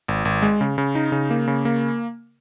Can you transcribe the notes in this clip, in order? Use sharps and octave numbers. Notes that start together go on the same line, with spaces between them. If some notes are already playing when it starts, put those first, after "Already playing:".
G#1
G#1
G#3
C#3
C#3
D#4
C#3
A#3
C#3
A#3